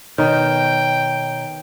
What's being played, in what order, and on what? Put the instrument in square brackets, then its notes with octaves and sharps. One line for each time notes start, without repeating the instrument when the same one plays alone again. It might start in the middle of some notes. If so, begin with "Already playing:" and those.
[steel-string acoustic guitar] B2 [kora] D#3 [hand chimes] C#5 A#5 [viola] G5